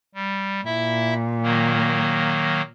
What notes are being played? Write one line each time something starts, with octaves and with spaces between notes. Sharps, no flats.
G3
A#2 E4 E5
D#3 F#3 A#3